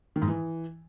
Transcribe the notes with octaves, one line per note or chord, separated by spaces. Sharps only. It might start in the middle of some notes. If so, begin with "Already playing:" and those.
D#3
G#2
E3